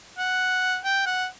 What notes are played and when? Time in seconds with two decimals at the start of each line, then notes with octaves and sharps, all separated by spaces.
0.18 F#5
0.84 G5
1.06 F#5